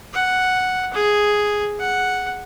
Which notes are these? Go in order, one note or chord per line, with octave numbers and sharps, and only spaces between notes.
F#5
G#4
F#5